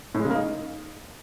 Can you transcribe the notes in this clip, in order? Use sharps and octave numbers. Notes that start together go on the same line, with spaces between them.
A2
G#3
C#3
A#3
D#4